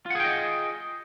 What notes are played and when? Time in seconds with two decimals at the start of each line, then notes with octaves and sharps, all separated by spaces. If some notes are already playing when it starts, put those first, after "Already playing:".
0.06 F4
0.10 F#5
0.15 G#4
0.20 G5
0.24 D#5